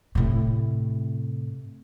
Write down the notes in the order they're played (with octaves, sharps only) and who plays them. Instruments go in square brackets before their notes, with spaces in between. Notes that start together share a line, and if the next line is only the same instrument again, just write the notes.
[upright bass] A2 C3